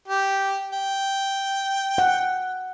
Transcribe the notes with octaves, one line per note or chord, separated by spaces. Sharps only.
G4
G5
F#5